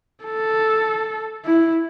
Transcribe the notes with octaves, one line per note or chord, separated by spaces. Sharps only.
A4
E4